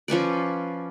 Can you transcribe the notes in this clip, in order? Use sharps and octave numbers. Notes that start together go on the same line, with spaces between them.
F3 C#4 B4 D5